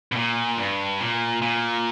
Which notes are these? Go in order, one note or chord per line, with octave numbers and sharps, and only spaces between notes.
B2
A#2
G2
A#2
A#2